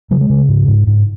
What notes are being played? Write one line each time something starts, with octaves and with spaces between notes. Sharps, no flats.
C#3 F#3
G#3
C#3
G#2
G#2
G#2